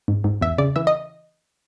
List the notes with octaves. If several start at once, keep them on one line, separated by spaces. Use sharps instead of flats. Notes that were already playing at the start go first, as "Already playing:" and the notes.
G#2
G#2
E2 E5
C#3 D5
E3 E5
D#5